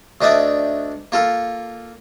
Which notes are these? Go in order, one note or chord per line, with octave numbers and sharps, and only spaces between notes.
D2 D4 D#4 D5 E5 D#6
A#3 F4 A4